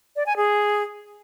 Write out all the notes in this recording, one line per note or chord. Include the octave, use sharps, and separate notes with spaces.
D5
G#5
G#4